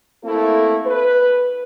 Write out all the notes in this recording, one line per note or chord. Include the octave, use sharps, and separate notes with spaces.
A3 A#3 C4 E4 A4
B4